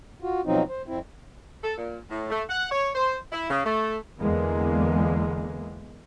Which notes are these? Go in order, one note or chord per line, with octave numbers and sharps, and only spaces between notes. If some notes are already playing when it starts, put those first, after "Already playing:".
F4 F#4
B2 F3 F#3 C4 D#4
C5
F2 C4 E4
A4
A#2
A2
A3
F#5
C#5
C5
E4
C#3
A3
E2 D3 E3 G#3 A#3 B3